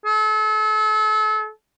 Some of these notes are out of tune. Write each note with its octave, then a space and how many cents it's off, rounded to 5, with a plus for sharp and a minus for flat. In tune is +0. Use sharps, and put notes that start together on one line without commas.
A4 -35